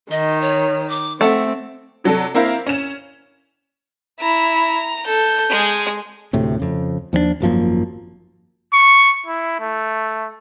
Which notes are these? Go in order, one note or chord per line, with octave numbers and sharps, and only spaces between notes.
D#3 D#5
C#5
D6
A3 C4 F#5
C3 F#3 D4 A4
A#3 C4 E4 A#4 F5
C#4 E7
E4 A#5
A4 G6
G#3 G#4
D2 A2 C3
F2 C#3
D#2 F3 B3 D4
G#1 F#2 F3 A#3
C#6
E4
A3